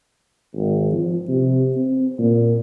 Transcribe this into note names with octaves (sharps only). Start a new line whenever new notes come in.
G#1
F3
C3
C4
A#2